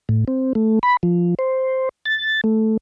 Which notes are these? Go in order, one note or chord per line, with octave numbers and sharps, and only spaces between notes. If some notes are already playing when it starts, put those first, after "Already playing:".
A2
C4
A3
B5
F3
C5
A6
A3